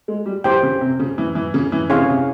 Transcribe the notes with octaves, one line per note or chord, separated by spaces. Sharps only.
G#3
G3
E3 G4 C5 G5
C#3
C3
C#3
E3
E3
C#3
E3
C3 C#4 E4 G#4 C#5 F5
C#3
C3